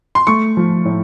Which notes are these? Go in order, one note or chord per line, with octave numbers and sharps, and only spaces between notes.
C6
A3 C#6
F3
A2